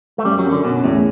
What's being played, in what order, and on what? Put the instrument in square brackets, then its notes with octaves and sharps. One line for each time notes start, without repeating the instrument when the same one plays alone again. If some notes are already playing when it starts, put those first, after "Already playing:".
[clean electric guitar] A3
[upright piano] F#2 [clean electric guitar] G3
[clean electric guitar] F#3
[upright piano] F#2
[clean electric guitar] D3
[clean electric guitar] B2 [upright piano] C#4
[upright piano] E2 [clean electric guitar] A2